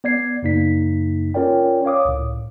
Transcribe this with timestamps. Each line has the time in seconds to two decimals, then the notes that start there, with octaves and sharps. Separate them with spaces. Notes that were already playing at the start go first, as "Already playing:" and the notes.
0.04 B3 D5 G#6 C7
0.43 F#2 C#3 A#3 D#4 B6
1.34 C#4 F4 A#4 C#5 D5 G5
1.85 C#5 F5 D6 D#6
2.05 C#2 A2